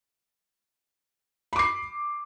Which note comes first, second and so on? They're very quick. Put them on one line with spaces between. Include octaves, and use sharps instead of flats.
B5 D6 C7